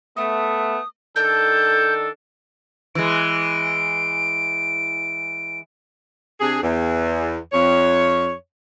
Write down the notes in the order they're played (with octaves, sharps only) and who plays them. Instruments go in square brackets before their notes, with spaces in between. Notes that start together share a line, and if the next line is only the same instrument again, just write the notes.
[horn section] A3 B3 [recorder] D#6
[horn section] D#3 D4 A4 [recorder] G6
[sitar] E3 G#3 [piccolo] D7
[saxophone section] C3 D4 G#4
E2
F2 C#5